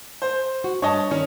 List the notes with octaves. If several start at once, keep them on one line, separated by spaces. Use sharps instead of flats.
C5
F#4
G2 D4 C#5 D#5 A5
D#3 C#4